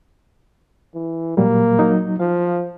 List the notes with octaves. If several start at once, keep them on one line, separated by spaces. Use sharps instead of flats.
E3
A#2 F#3 G3 A#3
F#3 D#4
F3 F5